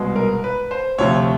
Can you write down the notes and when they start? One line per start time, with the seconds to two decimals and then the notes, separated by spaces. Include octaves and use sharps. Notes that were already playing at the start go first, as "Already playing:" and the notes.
Already playing: C2 B2 G#3
0.16 A#4
0.44 B4
0.71 C5
0.98 D2 C3 F3 A3 C#5